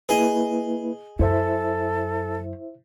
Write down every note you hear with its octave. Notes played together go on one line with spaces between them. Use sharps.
A#3 E4 G#4 B4 D#5
F#2 E4 A4 C5 E5